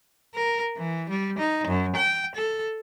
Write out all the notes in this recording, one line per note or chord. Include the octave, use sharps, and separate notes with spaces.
A#4
E3
G3
D#4
F#2
G5
A4